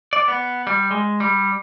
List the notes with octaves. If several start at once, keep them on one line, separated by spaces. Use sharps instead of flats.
D5
B3
G3
G#3
G3